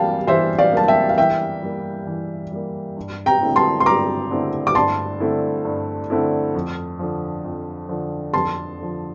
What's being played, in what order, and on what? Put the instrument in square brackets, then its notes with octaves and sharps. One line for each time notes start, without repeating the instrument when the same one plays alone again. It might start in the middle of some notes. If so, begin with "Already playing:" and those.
Already playing: [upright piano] E3 G3 A#3 [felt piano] F5 G5 A5
[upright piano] E3 [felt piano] C5 E5
[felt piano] D5 F5
[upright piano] G3 A#3 [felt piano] A5
[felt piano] E5 G5
F5
[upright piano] E3 [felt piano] E5 G5
[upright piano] G3 A#3
E3
G3 A#3
G2
[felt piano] G5 A#5
[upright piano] D3 A3 C4 E4
[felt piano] A5 C6
C6
[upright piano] G2 [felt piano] A#5 D6
[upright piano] D3 A3 C4 E4
[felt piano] D6
[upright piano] G2 [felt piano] A5 C6
[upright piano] D3 A3 C4 E4
G2
D3 A3 C4 E4
F2
D3 F3
F2
D3 F3
[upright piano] F2 [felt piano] A5 C6
[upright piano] D3 F3